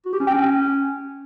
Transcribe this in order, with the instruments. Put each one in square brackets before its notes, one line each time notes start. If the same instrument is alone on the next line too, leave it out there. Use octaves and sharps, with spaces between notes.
[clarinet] F#4
G4
C#4
G5
C#4